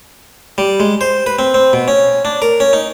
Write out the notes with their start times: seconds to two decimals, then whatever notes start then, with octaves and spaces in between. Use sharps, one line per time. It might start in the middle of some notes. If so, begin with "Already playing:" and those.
0.58 G3
0.80 G#3
1.01 C5
1.26 B4
1.39 C4
1.54 C4
1.73 B2
1.88 C#4
2.25 D4
2.42 A#4
2.60 C#4
2.73 D#4